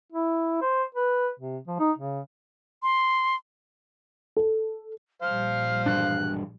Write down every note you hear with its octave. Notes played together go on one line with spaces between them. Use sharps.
E4
C5
B4
C3
F3
D#4
C#3
C6
A4
A#1 G3 C5 F5 F6
E1 G2 D4 F#6